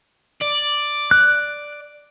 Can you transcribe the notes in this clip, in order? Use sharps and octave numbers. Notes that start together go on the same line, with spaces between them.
D5
F#6